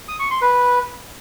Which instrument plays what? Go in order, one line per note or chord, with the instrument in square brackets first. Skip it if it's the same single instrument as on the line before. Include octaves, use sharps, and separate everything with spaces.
[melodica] D#6
C#6
C6
B4